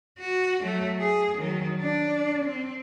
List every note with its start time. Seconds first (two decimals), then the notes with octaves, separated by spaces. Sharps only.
0.20 F#4
0.63 F#3 A3
1.00 G#4
1.38 D#3 F#3
1.81 D4
2.45 C4